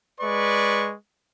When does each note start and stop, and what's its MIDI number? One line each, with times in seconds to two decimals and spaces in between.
0.21 0.92 56
0.21 0.92 71
0.21 0.92 74
0.21 0.92 85